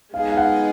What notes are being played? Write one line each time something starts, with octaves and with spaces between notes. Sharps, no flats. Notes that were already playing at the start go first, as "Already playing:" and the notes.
G#3 B3 D#4 G#4 F5
F5
F#5